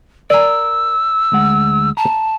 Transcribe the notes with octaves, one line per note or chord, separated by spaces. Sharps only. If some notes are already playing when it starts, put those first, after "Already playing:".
A#4 D5 G#5 A#5 E6
D2 G#3 F#5
A5 A#5